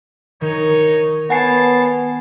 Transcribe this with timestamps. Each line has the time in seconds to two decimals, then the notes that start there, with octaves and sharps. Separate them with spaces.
0.41 D#3 D#4 C#5
1.30 B3 C#5 F#5 G#5 A5 C6 C7